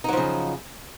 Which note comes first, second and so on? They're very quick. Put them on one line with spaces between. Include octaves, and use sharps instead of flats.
D#4 F#3 F3 C#3